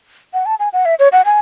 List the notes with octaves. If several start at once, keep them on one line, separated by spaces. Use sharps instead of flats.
F#5
A5
G#5
F#5
E5
C#5
F#5
G#5